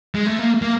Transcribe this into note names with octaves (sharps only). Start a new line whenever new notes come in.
G#3
A3
A#3
A#3